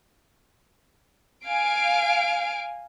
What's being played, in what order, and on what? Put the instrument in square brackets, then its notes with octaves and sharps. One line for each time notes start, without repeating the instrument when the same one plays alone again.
[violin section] F5 G#5 D7